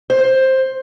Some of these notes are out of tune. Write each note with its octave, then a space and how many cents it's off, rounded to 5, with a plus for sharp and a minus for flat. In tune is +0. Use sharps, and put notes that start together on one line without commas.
C5 +10